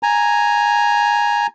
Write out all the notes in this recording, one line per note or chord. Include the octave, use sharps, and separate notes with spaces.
G#5 A#5